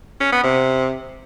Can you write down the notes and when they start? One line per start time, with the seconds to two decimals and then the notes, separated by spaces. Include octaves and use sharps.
0.21 C#4
0.32 B3
0.44 C3